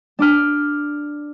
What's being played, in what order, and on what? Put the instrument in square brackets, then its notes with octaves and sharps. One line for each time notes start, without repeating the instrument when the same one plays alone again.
[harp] D4 D6 F6